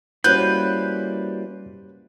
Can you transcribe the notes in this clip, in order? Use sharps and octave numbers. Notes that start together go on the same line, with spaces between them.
G3 A#3 C#4 E4 F#4 B4 C5 G6